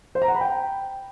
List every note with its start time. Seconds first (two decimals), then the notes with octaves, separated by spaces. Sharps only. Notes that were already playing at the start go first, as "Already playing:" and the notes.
0.15 C5
0.22 A#5
0.28 F#5
0.35 B5
0.41 G5